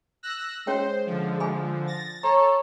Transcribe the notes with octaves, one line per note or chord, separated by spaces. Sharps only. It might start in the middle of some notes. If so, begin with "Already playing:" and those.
E6 F#6 A#6
G#3 C#4 C5 C#5 G5
D3 F3
G#4 G#5 B5
A6 A#6
A4 C#5 A#5